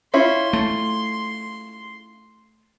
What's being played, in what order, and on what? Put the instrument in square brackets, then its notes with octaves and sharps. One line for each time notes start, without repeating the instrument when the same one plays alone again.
[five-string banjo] C#4 E4 F4 [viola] C6
[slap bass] A3